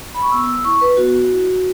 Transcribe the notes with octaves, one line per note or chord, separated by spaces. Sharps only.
B5
C#6
B3 E6
E6
E4 C#6
B4
B3 F#4
E4